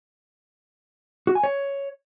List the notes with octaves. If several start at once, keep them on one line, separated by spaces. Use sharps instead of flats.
F#4
G#5
C#5